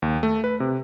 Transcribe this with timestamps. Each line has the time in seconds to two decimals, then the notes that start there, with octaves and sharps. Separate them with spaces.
0.02 D#2
0.23 A3
0.44 B4
0.60 C3